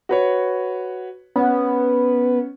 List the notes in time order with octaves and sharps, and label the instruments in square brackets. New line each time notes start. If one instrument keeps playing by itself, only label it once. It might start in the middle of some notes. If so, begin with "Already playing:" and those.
[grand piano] F#4 B4 C#5
[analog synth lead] B3 [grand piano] C#4